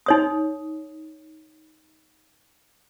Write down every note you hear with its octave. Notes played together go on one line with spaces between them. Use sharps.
D#4 C#5 D#6